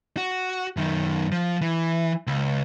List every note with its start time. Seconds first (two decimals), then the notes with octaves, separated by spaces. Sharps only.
0.17 F#4
0.77 F#2 D#3
1.32 F3
1.61 E3
2.27 C#2